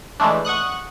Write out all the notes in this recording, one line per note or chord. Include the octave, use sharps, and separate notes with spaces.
E3 G#3 A3 D4
F#5 C#6 D#6 F#6